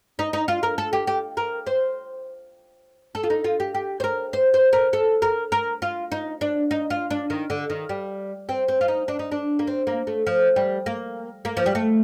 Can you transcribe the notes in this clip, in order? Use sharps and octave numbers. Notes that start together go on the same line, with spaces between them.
D#4
D#4
F4
A#4
A4
G4
G4
A#4
C5
A4
F4
D#4
F4
G4
G4
C5
A#4
C5
C5
A#4
A4
A#4
A#4
F4
D#4
D4
D#4
F4
D4
D#3
D3
D#3
G3
C4
C4
F4
D#4
D4
D#4
D4
A#3
C4
A#3
A3
F3
G3
A#3
A#3
F3
G3
A3